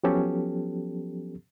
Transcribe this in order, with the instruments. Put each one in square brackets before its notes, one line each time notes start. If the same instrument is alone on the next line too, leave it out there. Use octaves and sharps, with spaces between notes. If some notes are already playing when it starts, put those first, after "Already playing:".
[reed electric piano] F3 F#3 B3 C#4 G4 A4